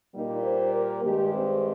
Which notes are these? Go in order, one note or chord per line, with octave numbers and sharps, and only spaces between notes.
A#2 G3 A#3 D#4
C5
A#4
G2 D#3 G#3 G4
C4